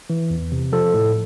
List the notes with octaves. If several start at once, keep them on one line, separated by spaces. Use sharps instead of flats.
E3
E2
C3
F3 A4
A2